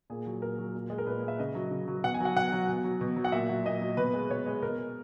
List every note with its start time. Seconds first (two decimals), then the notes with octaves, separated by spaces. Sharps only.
0.10 A#2 G#4
0.26 F#3
0.41 A#2 A#4
0.58 F#3
0.75 A#2
0.90 G#3
0.98 A#4
1.07 A#2 B4
1.22 G#3
1.28 E5
1.39 C#3 D#5
1.55 F#3
1.71 C#3
1.88 F#3
2.04 B2 F#5
2.14 G#5
2.20 F#3 F#5
2.36 B2 F#5
2.52 F#3
2.68 B2
2.84 F#3
3.01 B2
3.16 F#3
3.24 F#5
3.32 A#2 E5
3.49 F#3
3.66 A#2 D#5
3.81 F#3
3.97 B2 B4
4.14 G#3
4.30 B2 C#5
4.46 G#3
4.62 B2 A#4
4.78 G#3